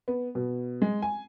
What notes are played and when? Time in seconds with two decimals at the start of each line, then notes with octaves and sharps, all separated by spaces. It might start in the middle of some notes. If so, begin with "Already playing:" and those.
0.08 B3
0.35 B2
0.82 G#3
1.02 G#5